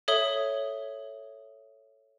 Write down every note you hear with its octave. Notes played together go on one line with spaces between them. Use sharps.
A4 C#5 E5 D#6 G7